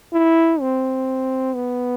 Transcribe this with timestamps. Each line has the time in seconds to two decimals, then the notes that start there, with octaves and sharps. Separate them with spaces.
0.13 E4
0.61 C4
1.55 B3